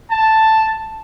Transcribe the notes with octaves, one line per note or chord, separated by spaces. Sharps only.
A5